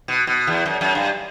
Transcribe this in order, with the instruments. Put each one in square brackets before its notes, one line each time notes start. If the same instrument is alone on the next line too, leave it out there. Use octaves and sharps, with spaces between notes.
[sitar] B2
B2
E2
F#2
F#2
G2